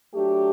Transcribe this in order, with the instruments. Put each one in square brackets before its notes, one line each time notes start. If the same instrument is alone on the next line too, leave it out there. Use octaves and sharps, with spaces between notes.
[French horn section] F#3 A3 D4 G4